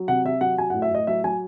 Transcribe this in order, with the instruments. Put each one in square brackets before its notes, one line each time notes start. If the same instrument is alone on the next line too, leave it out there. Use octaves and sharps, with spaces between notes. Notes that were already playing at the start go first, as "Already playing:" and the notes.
Already playing: [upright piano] F#3
C3 F#5
C3 E5
F#3 F#5
F#3 G#5
F#5
A2
E5
A2 D#5
F#3 E5
F#3 G#5